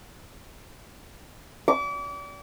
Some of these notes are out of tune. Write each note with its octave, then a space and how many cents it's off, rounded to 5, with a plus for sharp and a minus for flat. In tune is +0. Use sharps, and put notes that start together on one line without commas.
D6 -35